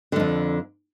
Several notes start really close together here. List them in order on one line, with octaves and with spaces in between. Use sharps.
D3 G#2 F2